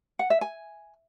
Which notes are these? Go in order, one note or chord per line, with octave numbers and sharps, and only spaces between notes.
F#5
E5
G#5